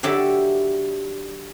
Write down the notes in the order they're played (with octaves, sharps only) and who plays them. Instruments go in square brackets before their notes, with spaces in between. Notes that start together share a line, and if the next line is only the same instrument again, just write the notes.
[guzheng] D3 F#3 G4 D5 E5